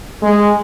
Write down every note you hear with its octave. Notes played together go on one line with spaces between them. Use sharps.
G#3